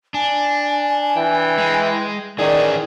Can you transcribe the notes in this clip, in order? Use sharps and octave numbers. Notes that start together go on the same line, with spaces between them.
D4 G#5
E3 G5
G#3
D#3 E3 C#4 G#4 D5